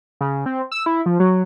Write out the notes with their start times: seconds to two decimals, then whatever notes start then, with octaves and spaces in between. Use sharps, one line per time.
0.21 C#3
0.46 C4
0.72 E6
0.86 E4
1.06 F3
1.20 F#3